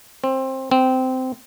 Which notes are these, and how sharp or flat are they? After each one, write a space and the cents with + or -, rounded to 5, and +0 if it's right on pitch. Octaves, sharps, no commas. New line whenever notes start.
C4 +20
C4 -15